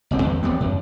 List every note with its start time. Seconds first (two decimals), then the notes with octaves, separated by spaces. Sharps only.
0.11 G1 C2 C4
0.22 E2
0.43 D#2 G3 B3 C4
0.60 F#2